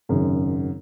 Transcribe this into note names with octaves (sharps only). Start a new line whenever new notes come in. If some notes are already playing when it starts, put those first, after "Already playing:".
G#1 F#2 C#3